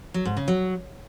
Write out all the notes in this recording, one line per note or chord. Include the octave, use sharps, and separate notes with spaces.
F#3
G#2
C#3
F#3